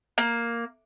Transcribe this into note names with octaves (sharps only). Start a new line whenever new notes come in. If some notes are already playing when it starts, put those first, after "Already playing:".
A#3